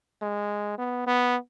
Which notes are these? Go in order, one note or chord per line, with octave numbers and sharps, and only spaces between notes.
G#3
B3
B3